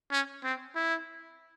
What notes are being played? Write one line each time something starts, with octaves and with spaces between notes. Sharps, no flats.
C#4
C4
E4